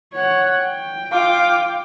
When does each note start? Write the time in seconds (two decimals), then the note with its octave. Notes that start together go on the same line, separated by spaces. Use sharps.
0.14 C#5 F#5
0.60 G5
1.12 F4 F5 D6